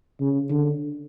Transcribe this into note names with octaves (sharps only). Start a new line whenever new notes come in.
C#3
D3